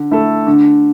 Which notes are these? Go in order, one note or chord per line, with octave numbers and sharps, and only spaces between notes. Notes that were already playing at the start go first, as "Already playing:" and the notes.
Already playing: D3
A3 E4 A4
D3